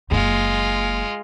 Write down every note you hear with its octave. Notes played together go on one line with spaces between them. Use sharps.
F#1 G#3 A#3 F4